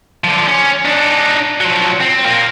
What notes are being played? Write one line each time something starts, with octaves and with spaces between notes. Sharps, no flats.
D3 F3
C#4
D4 D#4
F3 F#3
C4
F4 A#4